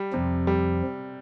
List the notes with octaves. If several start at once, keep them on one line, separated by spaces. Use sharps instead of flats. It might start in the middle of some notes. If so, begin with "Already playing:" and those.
Already playing: G3
F2 C3 F3
G3